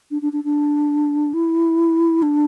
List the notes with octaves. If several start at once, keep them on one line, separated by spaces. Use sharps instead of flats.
D4
D4
D4
D4
E4
D4